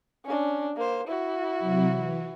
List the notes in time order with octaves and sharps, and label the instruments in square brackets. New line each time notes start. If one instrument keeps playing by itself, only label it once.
[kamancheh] C#4 D4
A#3 C5
E4 F#4
[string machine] C3 F#3
E3